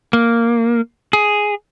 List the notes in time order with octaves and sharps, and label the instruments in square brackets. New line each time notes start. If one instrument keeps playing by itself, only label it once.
[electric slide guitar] A#3
G#4